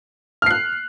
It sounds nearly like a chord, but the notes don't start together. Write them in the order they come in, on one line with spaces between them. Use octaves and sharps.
F6 C7 F#6